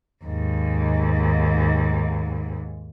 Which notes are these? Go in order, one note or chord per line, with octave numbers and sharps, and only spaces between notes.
D#2 G#2